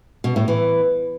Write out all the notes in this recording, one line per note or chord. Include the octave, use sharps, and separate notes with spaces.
B2
A2
E3